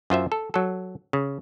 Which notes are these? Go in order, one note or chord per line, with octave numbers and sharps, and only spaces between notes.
F#2 F4 C5 E5
A4
F#3 A4
C#3